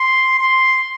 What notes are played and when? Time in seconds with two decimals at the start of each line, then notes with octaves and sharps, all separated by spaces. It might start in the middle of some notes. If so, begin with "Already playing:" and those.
Already playing: C6
0.39 C6